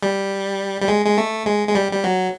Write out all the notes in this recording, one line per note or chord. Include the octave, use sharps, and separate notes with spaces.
G3
G3
G#3
G#3
A3
G#3
G#3
G3
G3
F#3